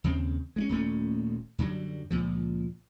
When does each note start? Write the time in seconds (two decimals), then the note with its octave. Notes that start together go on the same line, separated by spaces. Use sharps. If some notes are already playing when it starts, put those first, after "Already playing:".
0.04 D#2 C#3 C4
0.56 G#3 C4 C#4
0.69 D#1 A#2 A3 C#4
1.58 F#2 D3 F#3 G3
2.11 C#2 A#2 F3